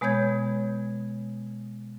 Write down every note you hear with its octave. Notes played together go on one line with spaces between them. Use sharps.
B2 G#3 B3 C#5 G6 G#6